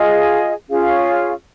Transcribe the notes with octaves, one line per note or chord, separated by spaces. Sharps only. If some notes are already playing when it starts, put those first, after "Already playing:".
Already playing: F4 G#4 D#5
C#4 F4 G#4 F5